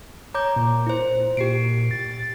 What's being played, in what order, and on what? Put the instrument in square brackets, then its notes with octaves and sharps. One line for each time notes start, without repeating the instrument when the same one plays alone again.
[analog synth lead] C#5 [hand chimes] A#5 D6 G6
[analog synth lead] A#2
[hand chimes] E4 C5
[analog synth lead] A#2 [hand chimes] G4 C7 D7
[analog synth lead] A6